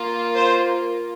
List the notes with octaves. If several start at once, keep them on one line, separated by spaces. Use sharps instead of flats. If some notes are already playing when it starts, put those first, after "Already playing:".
Already playing: A#3 F4
C5